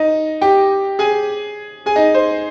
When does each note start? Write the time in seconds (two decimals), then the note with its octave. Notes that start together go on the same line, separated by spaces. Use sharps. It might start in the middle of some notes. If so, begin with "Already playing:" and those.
Already playing: D#4 D#5
0.41 G4 G5
0.99 G#4 G#5
1.86 G#4 G#5
1.96 D#4 D#5
2.15 C5